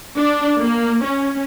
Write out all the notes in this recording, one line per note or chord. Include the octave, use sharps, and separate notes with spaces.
D4
A#3
C#4